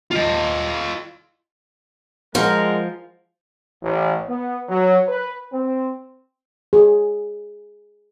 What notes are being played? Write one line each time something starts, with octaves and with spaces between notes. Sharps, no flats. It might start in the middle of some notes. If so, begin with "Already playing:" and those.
F4 D#5
F3 G#3 A#4 F#5 C6
A1
B3
F#3
B4
C4
G#4